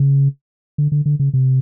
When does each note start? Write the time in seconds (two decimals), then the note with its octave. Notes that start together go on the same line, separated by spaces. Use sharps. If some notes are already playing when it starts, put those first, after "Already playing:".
Already playing: C#3
0.78 D3
0.92 D3
1.06 D3
1.19 C#3
1.34 C3